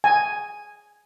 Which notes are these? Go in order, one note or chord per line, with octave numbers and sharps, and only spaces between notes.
G#5